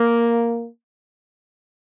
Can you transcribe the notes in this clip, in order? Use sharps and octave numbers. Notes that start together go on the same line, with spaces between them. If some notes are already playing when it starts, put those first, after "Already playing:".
Already playing: A#3